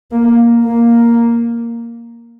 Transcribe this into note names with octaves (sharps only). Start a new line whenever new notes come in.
A#3
A#3